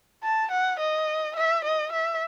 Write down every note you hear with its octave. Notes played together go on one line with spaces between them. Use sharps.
A5
F#5
D#5
E5
D#5
E5